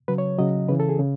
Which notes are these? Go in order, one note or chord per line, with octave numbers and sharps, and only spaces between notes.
C#3 F#3 B4
C#5
C#3 F#3 D#5
C#3 E3 B4
A4
G#4
C#3